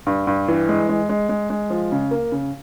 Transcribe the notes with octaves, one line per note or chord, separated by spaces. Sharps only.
G2
G2
E3
G#3
G#3
G#3
G#3
G#3
F3
C#3
A#3
C#3